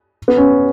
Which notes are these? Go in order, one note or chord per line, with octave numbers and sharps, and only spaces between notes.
B3
C#4